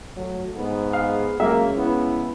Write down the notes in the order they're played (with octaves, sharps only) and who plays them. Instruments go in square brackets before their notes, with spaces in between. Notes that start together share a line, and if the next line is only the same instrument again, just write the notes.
[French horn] F#3 [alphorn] A3
[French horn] G#2 [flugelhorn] B3
[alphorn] G#4 [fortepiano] F5
[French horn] C#3 [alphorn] F#3 [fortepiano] G#3 E5 [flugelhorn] A#3
[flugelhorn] B3 [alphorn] E4